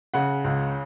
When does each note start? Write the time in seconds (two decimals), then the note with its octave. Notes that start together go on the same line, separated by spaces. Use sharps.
0.14 C#3 F#5
0.44 C#2